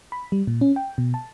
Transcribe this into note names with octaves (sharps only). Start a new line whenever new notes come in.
B5
G3
A#2
C#4
G5
B2
A5